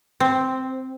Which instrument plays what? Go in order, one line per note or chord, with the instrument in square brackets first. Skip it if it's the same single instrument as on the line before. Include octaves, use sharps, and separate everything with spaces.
[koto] C4